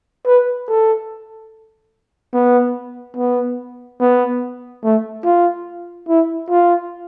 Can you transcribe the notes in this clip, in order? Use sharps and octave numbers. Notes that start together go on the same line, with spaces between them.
B4
A4
B3
B3
B3
A3
F4
E4
F4